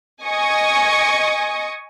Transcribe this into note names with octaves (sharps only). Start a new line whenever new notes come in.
D#5 G#5 C#6 D#6